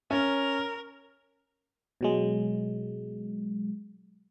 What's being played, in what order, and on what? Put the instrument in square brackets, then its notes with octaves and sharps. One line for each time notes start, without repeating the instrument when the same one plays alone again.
[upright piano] C#4 [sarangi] A#4
[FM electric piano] B2 F#3 G#3